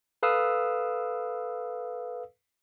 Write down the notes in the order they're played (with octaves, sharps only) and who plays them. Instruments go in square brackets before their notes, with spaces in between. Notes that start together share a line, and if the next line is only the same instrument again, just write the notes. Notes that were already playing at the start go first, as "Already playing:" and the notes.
[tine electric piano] A4 B4 F5 D#6 E6